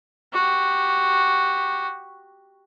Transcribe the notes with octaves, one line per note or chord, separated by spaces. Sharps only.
F#4 G4